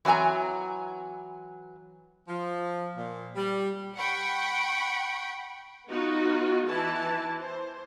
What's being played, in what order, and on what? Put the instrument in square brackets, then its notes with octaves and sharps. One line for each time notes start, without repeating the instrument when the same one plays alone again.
[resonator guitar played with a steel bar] E3 F#3 C4 G#5 A#5
[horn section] F3
A#2
G3
[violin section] F#5 G5 B5 C#6
[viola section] B3 D#4 F4 F#4
E3 E4 A5
C5